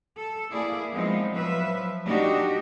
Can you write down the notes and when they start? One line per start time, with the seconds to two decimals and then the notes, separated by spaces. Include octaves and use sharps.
0.17 A4
0.52 A#3 E4 G#4 D5
0.93 F3 G#3 B3 C4 D#4
1.33 F3 F#3 B4 E5
2.06 D4 D#4 F#4 G4 D5 D#5